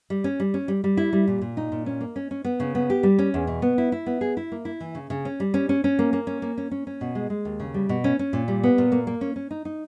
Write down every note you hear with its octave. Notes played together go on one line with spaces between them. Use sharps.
G3
C#4
G3
C#4
G3
G3
E4
G3
A#2
A#2
D#4
A#2
C#4
A#3
C#4
C#4
B3
C#3
B3
G4
G3
C#4
E2
B2
B3
E4
E4
B3
G#4
E4
A#3
E4
E3
C#3
C#3
C#4
G3
C#4
C#4
C#4
A#3
A#3
C#4
A#3
C#4
C#4
C#4
B2
G#3
G#3
D#2
C#3
G3
B2
C#4
C#4
A#2
G3
B3
A#2
A#3
A#3
C#4
C#4
D#4
D#4